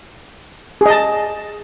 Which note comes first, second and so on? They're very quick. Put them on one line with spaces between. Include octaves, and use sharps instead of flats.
G#4 D#5 A5